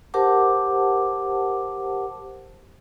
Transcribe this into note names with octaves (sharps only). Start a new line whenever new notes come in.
G4 A#4 C5 F#5 A5 D6